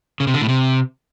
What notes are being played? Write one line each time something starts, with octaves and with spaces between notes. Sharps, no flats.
C#3
C3
D3
A2
C3